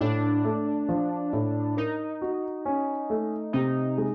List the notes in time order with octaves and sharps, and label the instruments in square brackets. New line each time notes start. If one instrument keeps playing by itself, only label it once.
[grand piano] A2 [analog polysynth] D4
[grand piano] A3
F3
A2
[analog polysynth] D#4 [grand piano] A#4
[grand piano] F#4
C#4
A3
[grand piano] C3 [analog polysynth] D#4
[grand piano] G#3